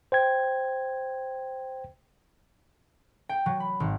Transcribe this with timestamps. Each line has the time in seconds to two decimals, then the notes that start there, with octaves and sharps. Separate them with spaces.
0.12 C5 G5 G#6
3.29 G5
3.46 F#3
3.60 B5
3.80 G#1